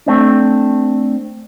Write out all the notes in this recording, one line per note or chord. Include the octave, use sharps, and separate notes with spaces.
A3 C4 D4